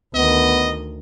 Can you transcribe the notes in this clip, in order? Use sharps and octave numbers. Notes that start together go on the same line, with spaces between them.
D2 D#3 B3 D#5